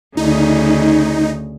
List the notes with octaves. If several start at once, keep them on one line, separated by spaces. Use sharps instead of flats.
D2 C#3 D#4